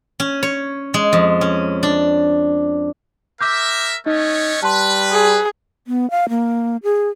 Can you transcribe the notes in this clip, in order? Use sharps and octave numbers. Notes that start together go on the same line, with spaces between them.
C#4
C#5
G#3
F2
C#4
D4
A#4 E5 D6 G6
A3 C#4 D#4 C#5 D#5
G3 B4 A5 C6
G#4
B3
F5
A#3
G#4